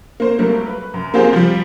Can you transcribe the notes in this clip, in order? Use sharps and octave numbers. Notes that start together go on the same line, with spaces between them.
A#3 C5
F#3 G3 A3 A#3
B4
F#2
A#3 C4 F4 G4 G#4 C5
F3 G3